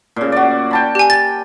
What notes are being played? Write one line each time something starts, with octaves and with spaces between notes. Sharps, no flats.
A#2 C#3
F#4 D5
G5 A5 B5
G4 G#5
A6